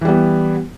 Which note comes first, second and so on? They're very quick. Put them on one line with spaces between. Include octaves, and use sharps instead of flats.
E3 G3 B3